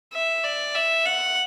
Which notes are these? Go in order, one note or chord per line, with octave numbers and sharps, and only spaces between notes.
E5
D5
E5
F#5